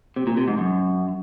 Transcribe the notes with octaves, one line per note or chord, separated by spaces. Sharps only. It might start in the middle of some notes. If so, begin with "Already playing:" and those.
C3
A#2
C3
G#2
F#2